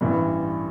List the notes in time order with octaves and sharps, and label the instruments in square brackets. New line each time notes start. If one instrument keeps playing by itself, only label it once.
[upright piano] A1 G2 E3 G3